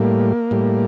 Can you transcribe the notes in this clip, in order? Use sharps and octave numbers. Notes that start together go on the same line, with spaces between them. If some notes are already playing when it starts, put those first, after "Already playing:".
Already playing: A2 G3 A#3
A2 G3